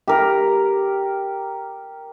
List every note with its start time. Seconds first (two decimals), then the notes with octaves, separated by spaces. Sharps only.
0.08 G4 A#4